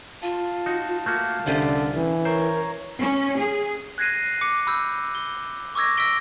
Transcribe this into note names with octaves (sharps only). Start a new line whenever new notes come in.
F4 F5 A5
D#4 F#4
A3 A#3 F#4
C2 D3 C#4 F4 G4
E3
A#4 C5 C#5 A#5
C#4
G#4
F#6 G#6 A#6 C7 D#7
D6 C#7
B5 E6 G6
G7
C#6 D6 E6 G#6 A#6
E6 A#6 B6 D7 G7